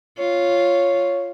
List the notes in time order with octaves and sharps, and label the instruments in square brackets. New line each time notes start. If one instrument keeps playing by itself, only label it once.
[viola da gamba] F4 [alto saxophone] C#5